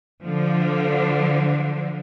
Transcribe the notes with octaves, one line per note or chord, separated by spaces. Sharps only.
D3 F3